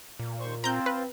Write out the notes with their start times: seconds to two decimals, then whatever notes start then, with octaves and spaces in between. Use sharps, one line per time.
0.20 A#2
0.40 D#2 C5 C#6
0.64 C4 F4 C5 A#5 G6
0.86 B4